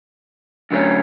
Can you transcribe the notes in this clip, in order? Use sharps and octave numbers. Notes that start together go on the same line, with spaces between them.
F#2 D3 F#3 A3 C#4